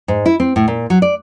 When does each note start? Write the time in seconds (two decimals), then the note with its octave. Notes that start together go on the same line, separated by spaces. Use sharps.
0.08 G#2
0.26 E4
0.40 C4
0.56 A2
0.68 A#2
0.90 F#3
1.02 D5